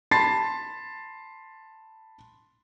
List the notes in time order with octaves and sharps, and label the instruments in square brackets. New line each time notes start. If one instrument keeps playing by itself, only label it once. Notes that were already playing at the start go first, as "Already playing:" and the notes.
[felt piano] A5 B5 C6 A6 C7